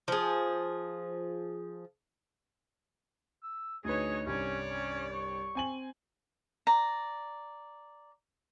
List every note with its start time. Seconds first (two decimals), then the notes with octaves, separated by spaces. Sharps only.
0.08 F3 G#4
3.43 E6
3.84 D2 D#4 G#4 B4 C#5
4.27 C2 G2 C#4 C#5 D5
4.70 C#4
5.13 C#6
5.55 C4 G#5 F#7
6.67 D5 A#5